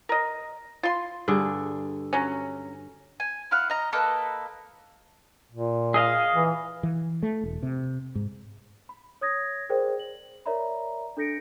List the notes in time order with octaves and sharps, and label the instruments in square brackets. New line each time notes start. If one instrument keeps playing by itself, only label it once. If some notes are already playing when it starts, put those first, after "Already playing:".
[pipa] A#4 D#5
F4 C6
[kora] G2 D3 G#4
[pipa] F#3 C#4
[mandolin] G#5
E4 F5 F#5
D#5 A#5
A#3 A4 B4 D#5
[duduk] A#2
[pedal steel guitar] G#4 D#5 F5
[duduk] E3
[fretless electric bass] E3
A3
E1
C3
G#2
[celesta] B5
C#5 D#6 G#6 A#6
G#4 A#4 C5 D5 G5
F#7
A#4 C#5 D5 E5 A#5 B5
D4 A4 G6 A#6 C#7 D7